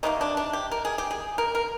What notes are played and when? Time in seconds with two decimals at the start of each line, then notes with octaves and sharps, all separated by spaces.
0.03 C3 D#3 G3 A#3 D#4
0.21 D4
0.37 D4
0.53 G4
0.71 A#4
0.85 G#4
0.98 G4
1.11 G#4
1.38 A#4
1.55 A#4